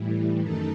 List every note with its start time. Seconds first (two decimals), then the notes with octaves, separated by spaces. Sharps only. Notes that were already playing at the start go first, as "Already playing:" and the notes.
Already playing: A2 E3 G3
0.41 F#2 D#3 A3 D#4 A4